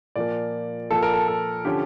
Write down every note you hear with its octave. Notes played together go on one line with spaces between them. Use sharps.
A#2 F3 A#3 D5
A#2 F3 A#3 A4
A#4
A4
A4
D3 F3 C#4 G4